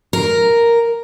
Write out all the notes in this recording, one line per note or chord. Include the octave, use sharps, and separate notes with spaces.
A#4